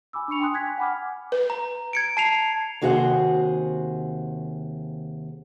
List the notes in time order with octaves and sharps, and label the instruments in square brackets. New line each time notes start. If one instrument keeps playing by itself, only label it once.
[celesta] G#5 B5 D6 E6
D4 B5 C#6 C#7 F7
G5 G#5 C6 D#6 F#6
G5 G#5 F#6 G#6 B6
F#5 G#5 B5 D6 F6
[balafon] B4
[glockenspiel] A#5
G#6 C#7 D7
A5 C7 F7
[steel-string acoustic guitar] D#2 C3 F#4 G#4 C5 F#5